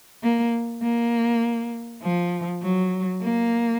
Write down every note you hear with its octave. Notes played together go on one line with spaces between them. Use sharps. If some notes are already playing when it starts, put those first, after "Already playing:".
A#3
A#3
F3
F#3
A#3